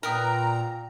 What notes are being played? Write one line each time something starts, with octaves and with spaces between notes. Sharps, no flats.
A#2 A#4 B4 G5 A#5 D#6